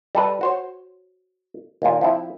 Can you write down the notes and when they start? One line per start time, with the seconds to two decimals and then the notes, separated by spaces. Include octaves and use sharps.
0.15 G3 A4 B4
0.41 F#4 C5 C#5
1.82 D#2 A#2
2.01 F3 C4 E4